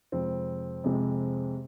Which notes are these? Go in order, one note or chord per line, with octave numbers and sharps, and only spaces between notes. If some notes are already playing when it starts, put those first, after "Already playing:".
F2 C3 G#3 C4
F2 C3 G#3